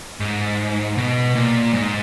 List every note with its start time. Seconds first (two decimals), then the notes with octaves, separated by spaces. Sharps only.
0.20 G#2
0.97 B2
1.35 A#2
1.73 G#2